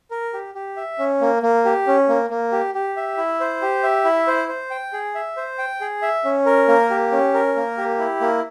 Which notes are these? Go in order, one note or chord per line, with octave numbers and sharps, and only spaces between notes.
A#4
G4
G4
E5
C#4
A#3
A#3
G4
C#4
A#3
A#3
G4
G4
E5
E4
C5
G4
E5
E4
C5
C5
G5
G#4
E5
C5
G5
G#4
E5
C#4
A#4
A#3
G4
C#4
A#4
A#3
G4
E4
A#3